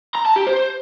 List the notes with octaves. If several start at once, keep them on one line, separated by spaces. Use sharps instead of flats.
A#5
A5
G4
C5